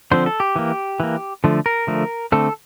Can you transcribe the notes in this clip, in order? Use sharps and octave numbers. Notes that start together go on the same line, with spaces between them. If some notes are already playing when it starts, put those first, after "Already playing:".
D3 F3 C4 C5
A4
G4
E3 A#3
E3 A#3
D3 F3 A3
A#4
D3 F3 A3
D3 A3 C4 A4